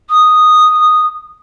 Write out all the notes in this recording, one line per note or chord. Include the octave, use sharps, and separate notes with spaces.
D#6